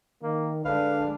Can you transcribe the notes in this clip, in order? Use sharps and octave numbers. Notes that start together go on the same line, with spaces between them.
D#3 A#3
D3 G#3 D4 B4 F5